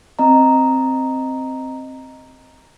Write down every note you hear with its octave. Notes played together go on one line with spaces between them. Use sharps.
C4 D#5 A#5